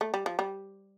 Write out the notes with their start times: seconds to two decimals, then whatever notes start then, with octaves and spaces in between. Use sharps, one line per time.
0.01 A3
0.14 G3
0.26 F3
0.39 G3